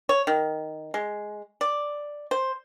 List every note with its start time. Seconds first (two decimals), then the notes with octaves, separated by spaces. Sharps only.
0.09 C#5
0.27 D#3
0.94 G#3
1.61 D5
2.31 C5